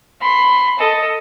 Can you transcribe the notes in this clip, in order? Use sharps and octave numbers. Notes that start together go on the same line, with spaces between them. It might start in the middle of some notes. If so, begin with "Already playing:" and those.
B5 C6
A4 D#5